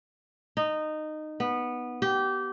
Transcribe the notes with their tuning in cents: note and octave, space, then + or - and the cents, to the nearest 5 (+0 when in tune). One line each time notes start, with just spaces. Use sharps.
D#4 -15
B3 -10
G4 -20